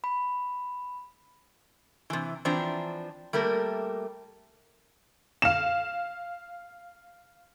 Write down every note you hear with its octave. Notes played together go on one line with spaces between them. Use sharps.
B5
C3 E3
E3 F3 C4 D4 A#5
G3 A3 A#3 A#4
F5 E7